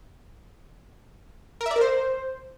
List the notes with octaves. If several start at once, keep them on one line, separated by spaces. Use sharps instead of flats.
A#4
E5
D5
A#4
C5